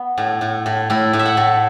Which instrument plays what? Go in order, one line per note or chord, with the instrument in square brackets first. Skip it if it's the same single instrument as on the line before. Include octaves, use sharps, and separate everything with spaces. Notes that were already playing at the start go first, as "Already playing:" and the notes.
Already playing: [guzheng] B3
A2
A2
A2
A2 E4
A2
E5
F#5
A2